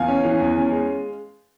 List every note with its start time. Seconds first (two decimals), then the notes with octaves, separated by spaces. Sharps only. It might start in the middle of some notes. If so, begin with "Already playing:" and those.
Already playing: E2 F5 G#5
0.08 C#4
0.25 E3
0.40 E2
0.56 C#4
0.71 G#3